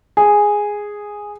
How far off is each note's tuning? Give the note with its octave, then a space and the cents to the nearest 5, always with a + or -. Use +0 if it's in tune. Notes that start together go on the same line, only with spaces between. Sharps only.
G#4 -5